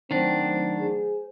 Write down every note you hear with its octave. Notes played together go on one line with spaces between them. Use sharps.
D#3 F#3 A3 C4 D4 C5
G#4